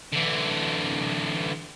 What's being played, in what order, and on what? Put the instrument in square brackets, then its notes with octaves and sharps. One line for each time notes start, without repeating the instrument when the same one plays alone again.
[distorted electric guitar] D3 E3